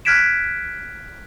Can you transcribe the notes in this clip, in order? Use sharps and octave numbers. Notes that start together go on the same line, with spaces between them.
F6 F#6 G#6 B6 D7 E7